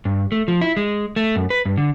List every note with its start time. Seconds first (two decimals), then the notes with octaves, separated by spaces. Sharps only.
0.05 G2
0.32 A3
0.48 F3
0.61 E4
0.77 G#3
1.16 A3
1.36 F#2
1.50 B4
1.65 G2
1.78 D3